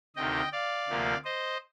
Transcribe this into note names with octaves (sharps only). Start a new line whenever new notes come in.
D2 C3 D#3 D#5 G5
D5 F5
D2 C3 F3 A#3
C5 D#5